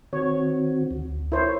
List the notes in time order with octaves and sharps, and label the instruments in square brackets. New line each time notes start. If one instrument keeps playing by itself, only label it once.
[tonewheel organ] D#3 C4 F#4 [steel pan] C#5
[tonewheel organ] D2
[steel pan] E4 C5 C#5 [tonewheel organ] A#4